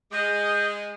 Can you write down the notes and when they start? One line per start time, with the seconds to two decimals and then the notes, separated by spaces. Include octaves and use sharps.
0.12 G#3 D#5 G6